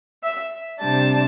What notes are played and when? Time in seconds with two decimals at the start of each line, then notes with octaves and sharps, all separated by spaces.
0.23 E5
0.81 C3 G3 D4 A5